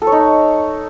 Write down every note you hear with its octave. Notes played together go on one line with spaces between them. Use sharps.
A4
C#5
D#4